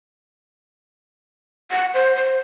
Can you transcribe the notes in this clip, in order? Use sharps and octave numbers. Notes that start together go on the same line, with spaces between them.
F#5
C5
C5